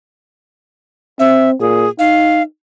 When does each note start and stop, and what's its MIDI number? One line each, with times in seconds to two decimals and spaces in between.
1.19 1.54 60
1.19 1.50 76
1.60 1.86 46
1.60 1.89 68
1.99 2.43 63
1.99 2.42 77